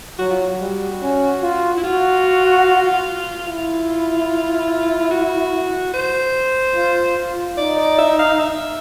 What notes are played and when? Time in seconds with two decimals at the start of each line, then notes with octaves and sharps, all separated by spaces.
0.19 F#3 F#4
0.31 F4
0.42 F#4
0.60 G3
1.02 C#4
1.42 F4
1.77 E4
1.84 F4 F#4
3.47 E4 F4
5.11 F#4
5.94 C5
6.76 F4
7.16 F4
7.57 D#4 D5
7.78 D5
7.98 E5
8.19 F5
8.40 E5